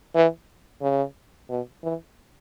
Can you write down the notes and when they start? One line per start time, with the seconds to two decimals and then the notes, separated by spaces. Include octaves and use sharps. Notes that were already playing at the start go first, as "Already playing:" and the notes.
0.15 E3
0.82 C#3
1.49 B2
1.84 E3